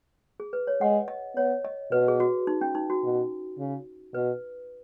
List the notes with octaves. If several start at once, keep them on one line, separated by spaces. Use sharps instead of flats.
G#4
B4
C#5
G#3 F#5
D#5
B3 C#5
D#5
B2 B4
G#4
F#4
D#4
C#4
D#4
F#4
B2
C#3
B2 B4